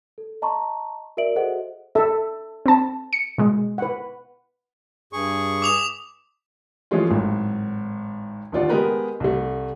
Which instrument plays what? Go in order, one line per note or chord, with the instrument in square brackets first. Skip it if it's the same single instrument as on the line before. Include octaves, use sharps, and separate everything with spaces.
[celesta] A4
D#5 A5 A#5 C6 C#6
F#4 A#4 D5 E5 D7 F#7
F#4 G#4 A4 C5 D#5 F#5
[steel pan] A4 E5
[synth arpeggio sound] C4 A5
C#7
B2 G#3
[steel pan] B4 F#5
[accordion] G2 G#4 C#6
[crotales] D6 D#6 F7
[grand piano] E3 F3 G#3 A3 C#4 F4
G#1 A2 F#3
D2 D#3 F4 D5 F#5
G#3 B3 G4 A#4 B4
C2 A3